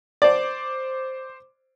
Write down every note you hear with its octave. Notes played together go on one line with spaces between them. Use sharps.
C5 D5 D6